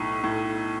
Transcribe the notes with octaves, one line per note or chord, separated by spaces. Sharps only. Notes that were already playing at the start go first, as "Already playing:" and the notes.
Already playing: B1 A2 C#6
A2